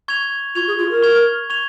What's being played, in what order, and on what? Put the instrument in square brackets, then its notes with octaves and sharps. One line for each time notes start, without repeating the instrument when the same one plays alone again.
[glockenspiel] C#6 G#6 F7
[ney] F4 [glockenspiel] C#6 G#6 F7
[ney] G#4
F4
A#4
[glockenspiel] C#6 G#6 F7
C#6 G#6 F7